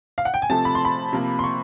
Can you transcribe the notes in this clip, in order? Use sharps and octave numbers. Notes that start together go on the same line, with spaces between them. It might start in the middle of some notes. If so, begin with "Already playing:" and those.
F5
F#5
G5
G#5
C3 F3 A3 C4 A5
B5
C6
B5
C3 F3 A#3
C6
C#6